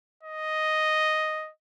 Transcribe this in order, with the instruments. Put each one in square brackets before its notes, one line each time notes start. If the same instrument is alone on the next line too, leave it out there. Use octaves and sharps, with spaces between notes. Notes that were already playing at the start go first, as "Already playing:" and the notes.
[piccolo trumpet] D#5